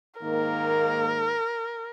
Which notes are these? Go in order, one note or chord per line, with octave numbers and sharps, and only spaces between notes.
G#2 D#3 A#3 A#4